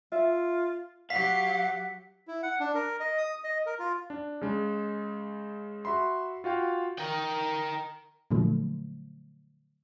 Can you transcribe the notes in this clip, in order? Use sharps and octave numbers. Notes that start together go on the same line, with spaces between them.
F4 E5
F#3 G4 F5 F#5 B6
E4
F#5
D4
A#4
D#5
D#6
D#5
A#4
F4
D4
C#3 G#3
F#4 E5 B5 C6
F4 F#4 F5 G5
A#4 G5
A#2 D3 F3 F#3 A3